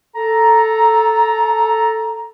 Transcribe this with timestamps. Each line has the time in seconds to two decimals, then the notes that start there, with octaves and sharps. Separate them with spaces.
0.16 A4 A#5